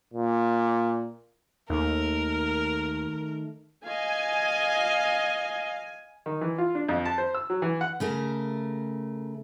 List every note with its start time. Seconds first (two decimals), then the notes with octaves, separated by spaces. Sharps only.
0.14 A#2
1.70 D#2 D#3 A3 A#4
3.86 D#5 F5 G#5
6.26 D#3
6.41 E3
6.58 F4
6.75 D4
6.89 F2
7.06 A5
7.18 C5
7.35 E6
7.50 F#3
7.62 E3
7.81 F#5
8.00 C#3 A3 A#4